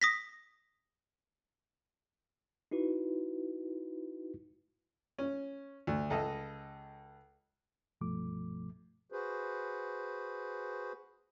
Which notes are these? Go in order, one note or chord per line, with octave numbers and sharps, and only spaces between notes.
D#6 A#6 B6
D#4 E4 F#4 B4
C#4
D2
C#2 A4 D#5
C2 G2 B2 F3 A3 D6
F#4 G#4 B4 C5